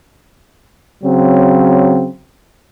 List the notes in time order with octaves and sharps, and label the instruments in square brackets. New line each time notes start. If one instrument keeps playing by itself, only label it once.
[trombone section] C#3 F#3 C4